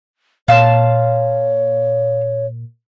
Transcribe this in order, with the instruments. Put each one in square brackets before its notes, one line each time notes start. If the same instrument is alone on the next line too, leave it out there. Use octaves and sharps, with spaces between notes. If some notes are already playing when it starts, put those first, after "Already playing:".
[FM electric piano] A#2 [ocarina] C#5 [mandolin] F5 A5 C6